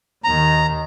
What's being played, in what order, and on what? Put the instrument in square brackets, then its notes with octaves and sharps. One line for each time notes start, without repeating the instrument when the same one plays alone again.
[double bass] D#2 D#3 [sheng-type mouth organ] A#5